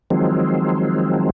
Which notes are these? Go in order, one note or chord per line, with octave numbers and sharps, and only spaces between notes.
D#3 F3 F#3 G#3 C4